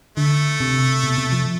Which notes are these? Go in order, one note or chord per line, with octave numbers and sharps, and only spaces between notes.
D3 A3
C3
B2
C3
F3